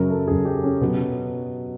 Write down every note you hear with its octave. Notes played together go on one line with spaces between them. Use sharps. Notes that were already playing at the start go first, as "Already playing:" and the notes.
Already playing: F#2 C#3 F#3 A#4
A4
F#2 C#3 F#3 G#4
G4
C#4
B2 F#3 B3